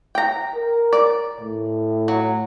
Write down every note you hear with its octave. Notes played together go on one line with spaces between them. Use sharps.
G5 A#5
A#4
D5
A2
F#3